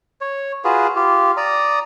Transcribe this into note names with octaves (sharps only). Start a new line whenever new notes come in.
C#5
F4 F#4 G#4 B4
F4 G4
D5 A#5 D#6